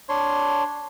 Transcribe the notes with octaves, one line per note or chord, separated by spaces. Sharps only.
D4 C#5 C6